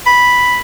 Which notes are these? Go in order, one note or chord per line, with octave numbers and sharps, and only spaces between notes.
B5